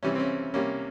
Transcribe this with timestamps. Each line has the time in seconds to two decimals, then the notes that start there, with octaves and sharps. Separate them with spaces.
0.03 C3 E3 G3 C#4
0.15 C4
0.20 C#4
0.54 C3 G3 A#3 C#4